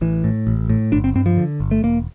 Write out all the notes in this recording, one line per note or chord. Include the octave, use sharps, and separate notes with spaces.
A1 E3
A2
A1
A2
G1 D4
C4
G2 C4
F3
D3
G1
A3
E1 A#3